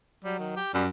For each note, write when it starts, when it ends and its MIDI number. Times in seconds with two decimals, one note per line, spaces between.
0.24 0.60 54
0.24 0.36 55
0.39 0.52 51
0.56 0.72 67
0.74 0.88 42
0.74 0.84 55